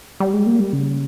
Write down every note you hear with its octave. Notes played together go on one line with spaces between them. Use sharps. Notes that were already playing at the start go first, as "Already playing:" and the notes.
G3
G#3
A#3
G3
C#3